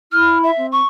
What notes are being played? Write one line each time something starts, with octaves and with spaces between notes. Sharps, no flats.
E4 F6
E5
C4
C#6